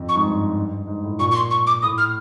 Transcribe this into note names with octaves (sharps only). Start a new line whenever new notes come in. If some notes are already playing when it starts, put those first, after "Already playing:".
Already playing: F2
C#6
G#2
G2
G#2
A2
A#2 C#6
C#6
C6
C#6
D6
A2 D#6
F6